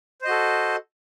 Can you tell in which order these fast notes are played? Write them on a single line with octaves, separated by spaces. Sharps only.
C5 D#5 F#4 A4